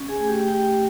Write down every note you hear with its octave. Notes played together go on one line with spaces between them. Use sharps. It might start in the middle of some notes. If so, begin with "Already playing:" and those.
Already playing: C#4
G#4 G#5
A3
G4 G5
A3 G4 G5